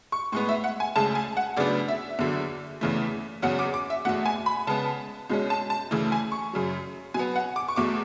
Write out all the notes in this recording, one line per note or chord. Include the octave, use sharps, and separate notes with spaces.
C#6
A2 G#3 B3 C#6
E5
F#5
G#5
D2 C#3 G#3 A5
G#5
F#5
D2 C#3 F#3 B3 D4 D5
E5
E2 D3 F#3
E2 C#3 E3 A3
E2 C#3 F#3 C#4 F#5
D6
D6
E5
E2 B2 A3 F#5
G#5
B5
C#3 G#3 B3 A5
C#2 B2 G#3 C#4
A5
A5
D2 C#3 E3 A3
G#5
C#6
F#2 C#3 F#3
B2 F#3 B3 G#5
F#5
D6
C#6
E2 B2 A3 D6